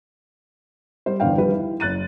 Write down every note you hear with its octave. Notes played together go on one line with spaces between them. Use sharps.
G3 C5
G1 E2 D4 D5 F5 G5
D#3 F3 G3 B4
E4
F#1 F#6 A6 D#7